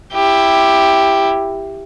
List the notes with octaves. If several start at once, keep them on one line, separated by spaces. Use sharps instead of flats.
E4 G4